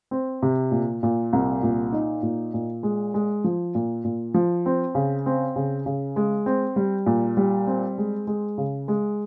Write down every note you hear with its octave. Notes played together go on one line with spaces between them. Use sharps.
C4
C3
A#2
A#2
C2
A#2
D#4
A#2
A#2
G#3
G#3
F3
A#2
A#2
F3
C4
C#3
C4
C#3
C#3
G#3
C4
G3
A#2
G3
C4
G#3
G#3
C#3
G#3